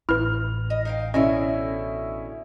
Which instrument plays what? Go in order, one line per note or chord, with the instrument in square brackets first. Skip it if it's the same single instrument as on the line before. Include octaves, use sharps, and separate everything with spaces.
[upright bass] A1 [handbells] E4 B4 [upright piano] F6
[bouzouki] D#5
D#4 F5 G5
[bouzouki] B2 D3 G#4 [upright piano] C#4 E4 [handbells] D#5